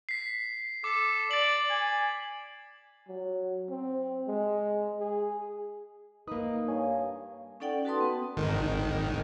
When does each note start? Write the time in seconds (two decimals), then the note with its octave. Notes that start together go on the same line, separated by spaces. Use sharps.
0.09 B6 C7
0.84 A4 D6
1.31 D5 A6 F#7
1.70 G#5
3.08 F#3
3.69 C4
4.28 G#3
5.00 G#4
6.28 A#3 D#4 B4 D#6
6.68 G2 C#5 F5 G#5
7.60 C#4 D#4 A4 D5 F#5 G5
7.85 F#4 A4 B4 A5 C6 D#6
8.01 B3
8.37 G#1 D#3